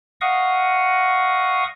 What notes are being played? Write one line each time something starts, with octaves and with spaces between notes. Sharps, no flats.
D#5 F5 F#5 C#6 D#6